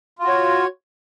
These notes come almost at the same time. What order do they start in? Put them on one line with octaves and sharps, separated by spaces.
F4 F#4 C#5